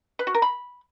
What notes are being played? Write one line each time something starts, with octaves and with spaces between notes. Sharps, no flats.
B4
F#4
A#4
B5